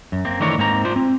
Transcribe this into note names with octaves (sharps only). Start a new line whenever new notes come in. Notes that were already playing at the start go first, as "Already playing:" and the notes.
F#2
A#3 C4
D#3 E3 A3 D4 A#4 C#5
G#2 A#3 C4 A#5
D4 F4 C5
C4